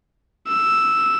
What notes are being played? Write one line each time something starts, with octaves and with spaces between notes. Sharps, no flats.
E6